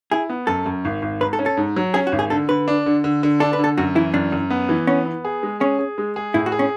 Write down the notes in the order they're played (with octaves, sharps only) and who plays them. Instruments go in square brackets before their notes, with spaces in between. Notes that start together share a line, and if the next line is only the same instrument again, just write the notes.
[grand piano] E4 [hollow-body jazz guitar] G#4
[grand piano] B3
[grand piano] F#2 [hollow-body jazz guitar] A4
[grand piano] F#2
G#1
G#1
[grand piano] G#2 [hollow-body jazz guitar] B4
[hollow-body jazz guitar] A4
[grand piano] C#4
[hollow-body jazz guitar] A4
[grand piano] G#2
F#3
[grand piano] C#4 [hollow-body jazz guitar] G#4
[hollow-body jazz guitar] F#4
[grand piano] G#1
[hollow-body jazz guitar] G#4
[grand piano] D3 [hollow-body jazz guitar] A4
[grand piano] D3 [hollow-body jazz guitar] B4
[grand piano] D4
D3
D3
D3
[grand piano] D4 [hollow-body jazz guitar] A4
[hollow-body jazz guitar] B4
[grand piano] D3
[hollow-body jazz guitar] A4
[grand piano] F#2 [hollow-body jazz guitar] F#4
[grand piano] E3 [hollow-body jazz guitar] E4
[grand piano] F#2 [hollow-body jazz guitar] D4
[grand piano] F#2
B3
E3
[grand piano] B3 [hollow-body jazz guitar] C#4
[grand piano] B3
G#4
G#3
[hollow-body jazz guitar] C#4 [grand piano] G#4
[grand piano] G#4
G#3
G#4
[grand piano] A2 [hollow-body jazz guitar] E4
[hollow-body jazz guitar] F#4
[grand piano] G#4
[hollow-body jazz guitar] C#4